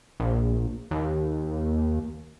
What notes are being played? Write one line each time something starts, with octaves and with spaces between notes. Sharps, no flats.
A#1
D#2